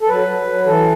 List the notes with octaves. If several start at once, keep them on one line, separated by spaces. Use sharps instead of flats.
A4
F#3 B4
F#3
F#3
E3 A4